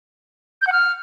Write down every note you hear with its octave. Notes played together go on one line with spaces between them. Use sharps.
G6
F#5
F6